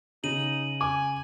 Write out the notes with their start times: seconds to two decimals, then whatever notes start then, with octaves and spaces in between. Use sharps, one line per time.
0.24 C#3 D#4 D#7 F#7
0.81 G#5 D6